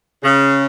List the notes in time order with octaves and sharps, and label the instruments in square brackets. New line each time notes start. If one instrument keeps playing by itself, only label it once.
[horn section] C#3